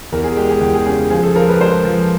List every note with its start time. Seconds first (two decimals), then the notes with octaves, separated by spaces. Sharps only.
0.12 E2 A#4
0.24 G#4
0.36 G#3 G4
0.49 G#4
0.61 E2 G4
0.74 G#4
0.86 C#3 G#4
1.10 F3 G#4
1.23 A4
1.35 F3 A#4
1.48 B4
1.60 G#3 C5
1.85 F3